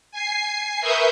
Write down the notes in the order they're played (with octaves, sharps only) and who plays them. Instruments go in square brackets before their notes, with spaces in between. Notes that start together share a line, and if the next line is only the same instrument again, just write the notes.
[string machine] G#5 C7
A#4 B4 E5 C#6 D#6 G6